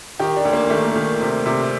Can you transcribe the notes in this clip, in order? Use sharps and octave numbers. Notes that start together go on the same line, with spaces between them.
D#3 G4
D4
D2
A#3
D#3 A3
D#3
C3
C3